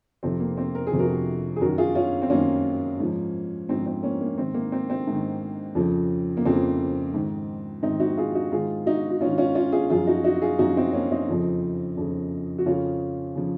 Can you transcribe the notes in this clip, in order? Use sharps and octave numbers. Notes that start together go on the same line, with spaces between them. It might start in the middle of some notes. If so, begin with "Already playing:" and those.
F2 C3 F3 C4
A#3
C4
A#4
G#4
F2 C3 F3
F#4 A#4
G#4
F#2 D#3 F#4 A#4
F4 G#4
C#4 F4
C4
F#2 D#3 A#3 C#4
G#2 F3
G#2 F3 C4
C4
A#3 C#4
A#3
G#2 D#3 C4
A#3
C4
C4
G#2 D#3
F2 C#3 F3
A#3
F2 C#3 F3 C4
G#2 D#3
G#2 D#3 C4 D#4
D#4 F#4
F4 G#4
D#4 F#4
G#2 D#3 F4 G#4
D#4 F#4
F#4
G#2 D#3 C#4 F4
C#4 F4
C#4 F4
F4 G#4
F#2 F3 F4 G#4
D#4 F#4
D#4 F#4
F4 G#4
F#2 F3 D#4 F#4
C4 D#4
A#3 C#4
C4 D#4
F2 C#3 F3
F2 C#3 F3
F#4
F2 C#3 F3 C#4 F4
C#3 F3